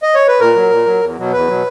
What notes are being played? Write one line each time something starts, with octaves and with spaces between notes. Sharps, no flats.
D#5
C#5
B4
A#2 A#4
F#3
A#2
F#3
E2
B2 F#3
E2 B4
B2 F#3